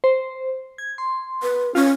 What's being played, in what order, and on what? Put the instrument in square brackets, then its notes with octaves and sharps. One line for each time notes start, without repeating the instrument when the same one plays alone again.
[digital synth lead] C5
G#6
C6
[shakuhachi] B4
[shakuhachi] C#4 [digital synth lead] F4